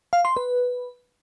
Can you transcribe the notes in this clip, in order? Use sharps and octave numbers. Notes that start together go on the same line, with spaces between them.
F5
C6
B4